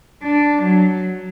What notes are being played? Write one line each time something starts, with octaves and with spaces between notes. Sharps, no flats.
D4
F#3